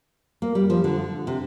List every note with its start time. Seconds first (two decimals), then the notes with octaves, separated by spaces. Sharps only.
0.42 A#3
0.55 G3
0.70 F3
0.84 D3
1.27 C3